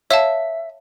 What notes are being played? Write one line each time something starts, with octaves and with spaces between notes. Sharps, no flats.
C#5 E5 F5 A5